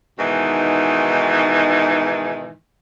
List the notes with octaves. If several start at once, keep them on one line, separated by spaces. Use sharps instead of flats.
G#2 B2 D#3 E3